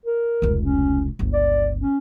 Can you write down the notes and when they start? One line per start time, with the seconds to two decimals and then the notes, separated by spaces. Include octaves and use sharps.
0.06 A#4
0.42 F1 C#2
0.60 C#4
1.19 G1 C#2
1.33 D5
1.80 C#4